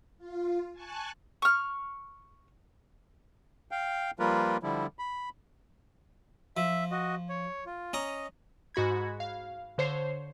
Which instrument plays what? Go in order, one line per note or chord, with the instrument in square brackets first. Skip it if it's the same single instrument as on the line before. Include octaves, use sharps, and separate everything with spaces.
[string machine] F4
G#5 A5 C#6 F#6
[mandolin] C#6 F6
[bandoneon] F5 G5
F3 G3 A#3 F4 A#4 B4
D3 F3 G3 E4
B5
[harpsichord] F3 [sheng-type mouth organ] E5
[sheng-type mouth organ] F#4 D#5
C#5
F4
[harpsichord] C#4 A#5 D#6 [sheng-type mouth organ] D#5
[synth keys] G#2 F#4 B5 G#6
F5
D3 C5 C#5 C7